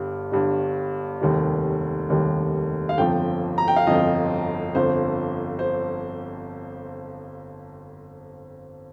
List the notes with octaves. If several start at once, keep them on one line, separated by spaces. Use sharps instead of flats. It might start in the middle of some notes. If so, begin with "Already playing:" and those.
Already playing: G1 G2 G3
G1 G2 G3
F1 D#2 D#3 G3
F1 D#2 D#3 G3
F5
G1 F2 F3 G5
A#5
G5
F5
G1 F2 F3 D#5
G1 F2 F3 C5
C5